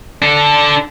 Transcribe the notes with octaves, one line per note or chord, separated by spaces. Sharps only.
D4 A4